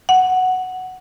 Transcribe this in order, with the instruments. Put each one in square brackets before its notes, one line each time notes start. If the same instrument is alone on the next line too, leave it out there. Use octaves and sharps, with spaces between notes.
[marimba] F#5